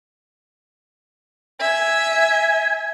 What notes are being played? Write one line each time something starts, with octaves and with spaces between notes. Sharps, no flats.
E5 G#5